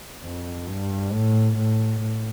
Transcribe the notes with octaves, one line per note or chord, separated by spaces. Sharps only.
F2
G2
A2
A2
A2